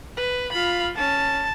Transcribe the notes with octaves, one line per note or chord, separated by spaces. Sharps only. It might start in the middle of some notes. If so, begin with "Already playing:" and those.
B4
F4 F5 B5
C#4 A5